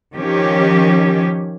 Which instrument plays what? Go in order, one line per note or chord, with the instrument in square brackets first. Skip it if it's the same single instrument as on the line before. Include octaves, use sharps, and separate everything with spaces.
[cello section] D#3 F3 C#4 G4